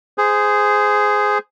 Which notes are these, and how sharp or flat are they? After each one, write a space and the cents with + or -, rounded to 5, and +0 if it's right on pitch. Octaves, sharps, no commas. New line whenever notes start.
G#4 +0 C5 -20